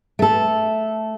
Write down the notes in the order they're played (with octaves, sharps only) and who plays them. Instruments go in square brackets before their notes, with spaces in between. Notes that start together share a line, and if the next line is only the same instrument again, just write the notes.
[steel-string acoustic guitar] A3 A4